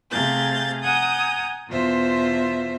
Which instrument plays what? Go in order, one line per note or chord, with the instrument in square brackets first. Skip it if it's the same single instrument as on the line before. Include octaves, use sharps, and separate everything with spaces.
[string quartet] C3 A3 G#4 F5 G6 A6
F#5 G#5 A#5 D#6 G6
E2 B2 F4 C5 E5